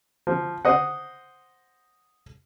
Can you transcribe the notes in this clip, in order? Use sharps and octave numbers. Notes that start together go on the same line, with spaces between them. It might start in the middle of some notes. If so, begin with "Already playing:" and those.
F3
C5 D#5 F#5